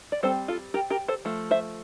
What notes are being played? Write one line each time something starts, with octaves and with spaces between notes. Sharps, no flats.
D5
G3 C4 A4 C5
F4 A4
G4 A#4
G4 A#4
A4 C5
F3 A3
C5 E5